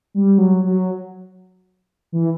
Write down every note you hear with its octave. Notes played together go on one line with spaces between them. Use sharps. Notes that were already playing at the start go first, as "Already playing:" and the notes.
G3
F#3
F#3
E3